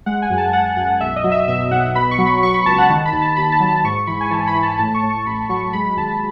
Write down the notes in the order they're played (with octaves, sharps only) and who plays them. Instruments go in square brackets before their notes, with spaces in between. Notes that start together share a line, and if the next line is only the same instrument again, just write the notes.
[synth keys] G#3 F#5
G#5
F#2
A5
F#2 F#5
F#2 F#5
B1 E5
D#5
F#3
E5
B2 E5
B1 F#5
B2 B5
C#6
F#3
B5
F#3 C#6
B5
C#2 A5
F#5
D#3 A5
B5
D#2
A5
D#2 B5
A5
F#3
A5
G#2 C#6
E3 B5
G#5
E3 A5
B5
E3
A5
A2 A5
C#6
A2
C#6
A1 B5
F#3 C#6
G#3 B5
D#2 A5